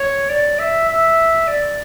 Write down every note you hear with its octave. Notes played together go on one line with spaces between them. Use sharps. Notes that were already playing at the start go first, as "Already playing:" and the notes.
Already playing: C#5
D5
E5
E5
D5